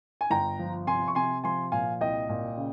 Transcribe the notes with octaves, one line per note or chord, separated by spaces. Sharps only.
G#5
G1 G5 A#5
F3
C3 G#5 C6
C#6
C3 G#5 C6
F3 G#5 C6
A#2 F5 G#5
C2 D#5 G5
A#2
C#3